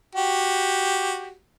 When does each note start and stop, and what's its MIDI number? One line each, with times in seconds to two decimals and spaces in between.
0.15 1.35 66
0.15 1.35 67